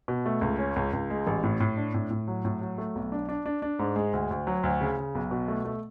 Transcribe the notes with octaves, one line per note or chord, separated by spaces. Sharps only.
B2
A3
C#2
C#4
C#2
C#2
G#3
A1
A2
A2
D4
A2
A2
F#3
A2
F#3
A3
B1
D4
D4
D4
D4
G#2
G#3
D2
D2
F#3
D2
C#3
C#3
B1
B2
A3
A3